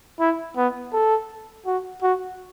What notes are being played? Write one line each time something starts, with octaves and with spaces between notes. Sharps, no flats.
E4
B3
A4
F#4
F#4